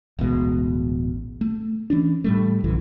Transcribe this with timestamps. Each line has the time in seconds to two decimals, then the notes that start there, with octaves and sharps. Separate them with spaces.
0.19 D1 A1 B2 G#3
1.41 A3
1.90 E3 C#4 D4
2.24 A2 G3 A3
2.64 A#1 F#2 C#3 E3